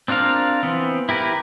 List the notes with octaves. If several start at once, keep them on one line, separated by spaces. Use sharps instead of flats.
C4 D4 F4 A#4 F5
E3 B3 C4
E4 G4 A#4 B4